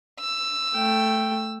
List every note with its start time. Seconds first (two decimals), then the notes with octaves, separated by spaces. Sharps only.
0.20 E6
0.74 A3 G5